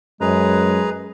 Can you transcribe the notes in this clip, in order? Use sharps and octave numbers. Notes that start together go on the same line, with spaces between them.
F#2 G#3 G#4 B4 A#5